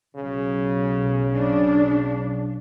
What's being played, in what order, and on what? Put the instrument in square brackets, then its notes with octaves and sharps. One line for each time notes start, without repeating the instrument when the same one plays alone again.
[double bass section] B1 F#3 [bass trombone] C#3
[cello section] D4